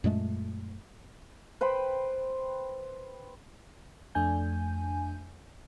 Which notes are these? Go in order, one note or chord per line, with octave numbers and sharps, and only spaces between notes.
F#2 A#2 G#3 A3
B4 C5 G5 B5
F2 A3 D4 G#5 G6